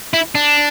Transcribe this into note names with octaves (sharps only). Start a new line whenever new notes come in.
E4
D4